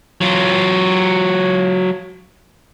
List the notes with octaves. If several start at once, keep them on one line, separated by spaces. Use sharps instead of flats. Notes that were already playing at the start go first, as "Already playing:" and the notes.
F#3 F4